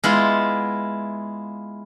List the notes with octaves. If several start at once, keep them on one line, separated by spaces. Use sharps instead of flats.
G#3 B3 E4 F4